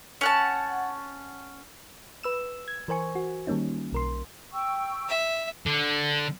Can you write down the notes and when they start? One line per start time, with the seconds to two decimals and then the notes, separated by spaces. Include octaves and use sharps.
0.21 C#4 F#5 A5
2.23 B4 E6 E7
2.68 G#6
2.88 E3 A#4 C5 G#5 C#6
3.15 F#4
3.47 D#3 G3 A#3 C#4 D#4
3.92 B1 A#4 C6
4.52 G5 C#6 E6
5.09 E5
5.66 D3